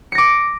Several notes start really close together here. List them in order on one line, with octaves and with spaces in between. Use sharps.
C#7 A#6 D6